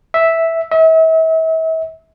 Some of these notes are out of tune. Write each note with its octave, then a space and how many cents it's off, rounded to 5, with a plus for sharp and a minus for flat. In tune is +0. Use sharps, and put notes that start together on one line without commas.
E5 -5
E5 -40